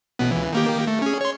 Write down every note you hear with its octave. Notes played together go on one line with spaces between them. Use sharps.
A1 B2 B3
C#2 E3
D#3 A#3 G4
A3
C#4 G#4
C#5 C6